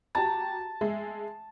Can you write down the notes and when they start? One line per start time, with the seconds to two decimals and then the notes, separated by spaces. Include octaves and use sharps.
0.15 F#4 G4 A5 A#5
0.81 G#3 E5